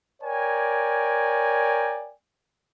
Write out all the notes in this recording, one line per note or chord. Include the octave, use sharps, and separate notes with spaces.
A#4 C#5 D5 G5 G#5